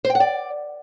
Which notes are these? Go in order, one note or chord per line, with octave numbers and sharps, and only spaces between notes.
C5
G5
F#5
D5